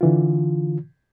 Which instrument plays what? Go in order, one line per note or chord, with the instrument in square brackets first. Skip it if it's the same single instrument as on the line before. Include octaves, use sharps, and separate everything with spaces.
[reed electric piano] D3 E3 F4